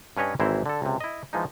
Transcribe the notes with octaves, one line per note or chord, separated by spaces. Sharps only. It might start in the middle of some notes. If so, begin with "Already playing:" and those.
G2 C#4 B4 C#5 D#5 G#5
G#1 E3 C4 E4 C5 A#5
D3 A4
C#2 C3
E4 D#5
E3 F3 G#3 D#4